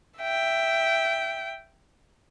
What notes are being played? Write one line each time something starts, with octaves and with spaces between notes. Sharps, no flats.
E5 G5